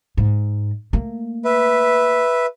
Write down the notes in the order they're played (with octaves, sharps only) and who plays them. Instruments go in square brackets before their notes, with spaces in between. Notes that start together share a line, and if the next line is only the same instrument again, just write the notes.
[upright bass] G#2
A3 A#3
[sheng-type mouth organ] B4 E5